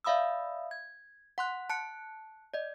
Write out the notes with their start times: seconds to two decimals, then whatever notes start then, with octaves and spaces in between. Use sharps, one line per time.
0.04 D5 E5 F5 B5 D#6 E6
0.71 G#6
1.38 F#5 C6 F#6
1.70 A5 F#6 C#7
2.54 D5 D#5